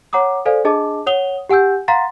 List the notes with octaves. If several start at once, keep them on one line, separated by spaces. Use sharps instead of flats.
C#5 F#5 A#5 D6 D#6
A4 C5 D5 F5 G#5
D4 G#4 D#5 A5 D6
C#5 F#5 D#6 F7 G7
G4 F#5 G#5 E6 G6
F5 F#5 A#5 C6 A6